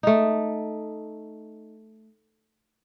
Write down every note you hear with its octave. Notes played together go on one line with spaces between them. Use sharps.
A3 D#4